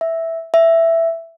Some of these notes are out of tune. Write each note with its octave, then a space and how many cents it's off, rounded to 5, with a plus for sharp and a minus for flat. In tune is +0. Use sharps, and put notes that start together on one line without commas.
E5 -5
E5 +5